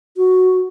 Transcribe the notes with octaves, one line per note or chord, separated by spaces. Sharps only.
F#4